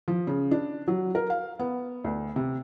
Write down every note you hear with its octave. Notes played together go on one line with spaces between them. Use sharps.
F3
C#3
D4
F#3
A#4
F5
B3
D2
C3